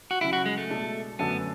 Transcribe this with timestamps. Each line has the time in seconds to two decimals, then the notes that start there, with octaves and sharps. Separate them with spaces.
0.11 F#4
0.21 C#3 F#3 C#4 E4
0.33 F#4
0.46 G#3
0.58 A3
0.70 B2 G#3 D4 A4
1.19 F#2 D3 A3 B3 D4 A4